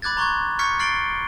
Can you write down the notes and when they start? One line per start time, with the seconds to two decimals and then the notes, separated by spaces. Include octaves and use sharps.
0.02 B5 D6 F#6 G#6 A6
0.17 A#5 C6 C#6 F#6 G#6
0.59 C#6 F6 G6 G#6 B6 C#7
0.79 F6 A6 C7 D7 F#7 G7